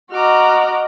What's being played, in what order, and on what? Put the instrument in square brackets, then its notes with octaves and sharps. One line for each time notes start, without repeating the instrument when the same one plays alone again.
[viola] F#4 D#5 [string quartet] A#5 D6 F6